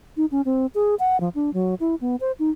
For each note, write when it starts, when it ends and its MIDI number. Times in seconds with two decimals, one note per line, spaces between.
0.17 0.26 63
0.31 0.42 61
0.45 0.66 60
0.75 0.95 68
0.99 1.20 78
1.20 1.29 53
1.35 1.53 62
1.54 1.75 54
1.80 1.95 64
2.01 2.16 59
2.20 2.32 72
2.39 2.50 63